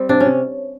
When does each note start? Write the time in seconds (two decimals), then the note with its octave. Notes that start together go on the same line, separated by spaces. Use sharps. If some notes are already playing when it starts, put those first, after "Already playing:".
Already playing: G3 C4
0.09 C3 D4
0.20 C3 C#4